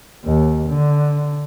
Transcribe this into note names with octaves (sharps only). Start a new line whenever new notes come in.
D#2
D3